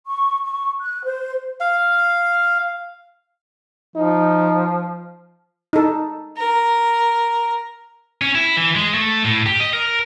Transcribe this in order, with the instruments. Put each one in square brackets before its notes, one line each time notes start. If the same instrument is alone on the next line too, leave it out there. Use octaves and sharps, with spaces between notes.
[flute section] C#6
C#6
F#6
C5
[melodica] F5
[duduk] F3 [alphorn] D#4
[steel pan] D#4 A4
[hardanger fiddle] A#4
[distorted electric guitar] C#4
E4
E3
G#3
A3
A2
G4
D#5
A#4